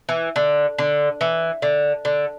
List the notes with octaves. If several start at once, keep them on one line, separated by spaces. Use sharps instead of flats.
E3
D3
D3
E3
D3
D3